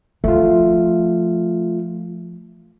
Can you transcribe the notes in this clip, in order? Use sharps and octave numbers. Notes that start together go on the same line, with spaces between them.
F3 A3 F4